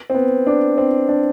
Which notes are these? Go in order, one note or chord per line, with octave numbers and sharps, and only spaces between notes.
C4
B3
D4
C4
D4